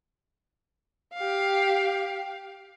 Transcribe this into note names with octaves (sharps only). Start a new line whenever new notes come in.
G4 F5